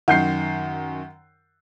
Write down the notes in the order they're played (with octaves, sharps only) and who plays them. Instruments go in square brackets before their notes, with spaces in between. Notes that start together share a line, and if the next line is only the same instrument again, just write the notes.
[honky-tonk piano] F#2 D#3 [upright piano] F#5 G6 C7